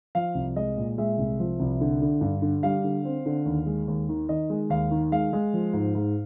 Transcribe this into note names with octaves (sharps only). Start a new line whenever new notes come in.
F3 F5
C2
G#3 D#5
A#2
G#3 E5
C2
F3
C2
D3
D3
G2
D3
G3 F5
D3
C4
D3
D#2
G#3
D#2
D#3
D#3 D#5
G#3
D#2 F5
D#3
G#3 F5
G#3
F3
G#2
G#2